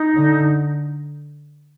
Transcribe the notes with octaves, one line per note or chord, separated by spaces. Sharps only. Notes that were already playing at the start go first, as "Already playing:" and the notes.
Already playing: D#4
D3